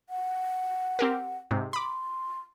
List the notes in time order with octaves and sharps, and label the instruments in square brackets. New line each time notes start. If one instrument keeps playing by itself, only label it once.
[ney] F#5
[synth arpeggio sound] C4 G4 A#4
G#2 C3
[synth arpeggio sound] B5 D6 [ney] C6